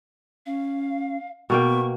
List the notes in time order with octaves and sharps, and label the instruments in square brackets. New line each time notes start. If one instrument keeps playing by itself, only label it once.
[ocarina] C#4 [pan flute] F5
[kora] B2 A#3 G5 [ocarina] B3 [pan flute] C#6